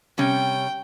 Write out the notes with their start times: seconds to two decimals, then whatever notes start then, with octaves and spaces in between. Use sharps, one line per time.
0.18 C3 G3 C#4 G5